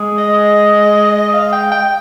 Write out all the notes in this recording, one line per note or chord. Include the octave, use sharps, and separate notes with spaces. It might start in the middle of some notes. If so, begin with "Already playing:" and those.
Already playing: G#3
D#5
F5
G5
G5